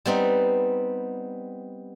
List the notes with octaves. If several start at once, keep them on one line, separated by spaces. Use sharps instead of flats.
G3 B3 C4 D#4